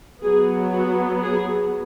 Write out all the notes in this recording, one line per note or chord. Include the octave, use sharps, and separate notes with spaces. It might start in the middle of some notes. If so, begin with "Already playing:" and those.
F#3 B3 G#4
F#4
G#4